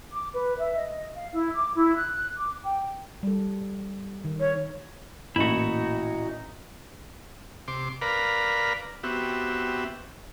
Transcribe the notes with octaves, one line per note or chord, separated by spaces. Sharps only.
D6
B4
E5
D#5
F5
E4
D6
E4
F#6
D6
G5
G3 A4
D#3
C#5
A1 A#2 D#4 E4 F#4
C3 C6 D6
A#4 B4 D5 F5 A#5 B5
B3 C4 F#4 G4 E5